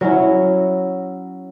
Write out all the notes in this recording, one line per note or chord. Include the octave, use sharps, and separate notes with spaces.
F#3 C#4 E4